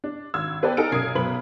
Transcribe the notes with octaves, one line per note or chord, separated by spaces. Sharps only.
D4
G#1 E6 G#6
B3 B4 C5 D5 G5 A5
D#4 A4 G#5 A#5 F6 D7
B1 C#4 A#4 D#6 G#6 C7
B1 F#2 B3 B5 F#7